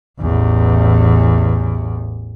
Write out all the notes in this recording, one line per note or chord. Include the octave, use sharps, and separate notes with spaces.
A1 E2